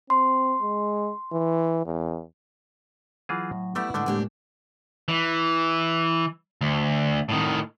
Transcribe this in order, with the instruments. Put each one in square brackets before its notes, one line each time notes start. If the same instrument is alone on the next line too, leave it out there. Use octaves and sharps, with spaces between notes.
[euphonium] C4 [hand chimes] C6
[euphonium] G#3
E3
E2
[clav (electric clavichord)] E3 F4 G#4 [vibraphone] F#3
[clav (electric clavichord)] A2
[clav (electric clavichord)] G3 A3 G4 [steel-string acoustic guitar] B3 D4 E4 [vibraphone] F#5
[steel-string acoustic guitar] A2 G#3 D4 [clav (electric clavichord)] D3 A3
[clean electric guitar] A2 G#3 A#3 [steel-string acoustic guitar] C4 D4 G4
[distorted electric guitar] E3
D2
A2 D#3